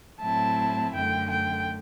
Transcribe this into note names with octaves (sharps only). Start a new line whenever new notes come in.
A2 F#3 C4 E4 A5
F#2 D3 A3 G5
G5